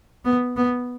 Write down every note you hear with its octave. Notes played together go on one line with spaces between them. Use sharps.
B3
B3